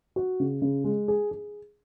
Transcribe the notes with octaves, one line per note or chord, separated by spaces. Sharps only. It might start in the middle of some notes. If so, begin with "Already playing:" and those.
F#4
C#3
C#3
G#3
G#4
G#4